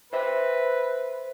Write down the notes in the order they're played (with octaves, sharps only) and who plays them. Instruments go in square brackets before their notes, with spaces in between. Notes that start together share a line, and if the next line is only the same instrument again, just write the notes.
[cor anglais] B4 [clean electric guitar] C5 E5